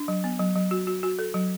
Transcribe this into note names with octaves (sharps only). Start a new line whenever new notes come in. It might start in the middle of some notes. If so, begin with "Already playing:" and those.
Already playing: D4
F#3
B3
F#3
F#3
F#4
F#4
F#4
A4
F#3